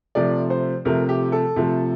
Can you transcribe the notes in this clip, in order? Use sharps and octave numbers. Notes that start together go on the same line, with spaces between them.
C3 F3 A3 D5
C5
C3 F3 A3 A#4
G4
A4
C3 F3 A3